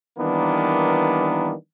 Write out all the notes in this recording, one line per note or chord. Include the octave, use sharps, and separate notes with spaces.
D#3 E3 G3 A#3 B3 D4